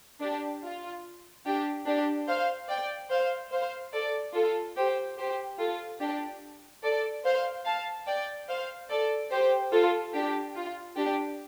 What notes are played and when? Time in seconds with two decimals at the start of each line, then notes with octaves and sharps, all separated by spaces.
0.21 D4 G4
0.63 F4
1.45 D4 G4
1.86 D4 G4
2.28 C5 F5
2.69 D5 G5
3.10 C5 F5
3.52 C5 F5
3.93 A4 D5
4.35 F4 A4
4.76 G4 C5
5.17 G4 C5
5.58 F4 A4
6.00 D4 G4
6.83 A4 D5
7.24 C5 F5
7.65 F5 A5
8.07 D5 G5
8.48 C5 F5
8.90 A4 D5
9.30 G4 C5
9.71 F4 A4
10.14 D4 G4
10.55 F4
10.96 D4 G4